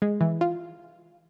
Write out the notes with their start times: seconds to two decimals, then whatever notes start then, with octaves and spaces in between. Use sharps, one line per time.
0.02 G#3
0.21 E3
0.41 F4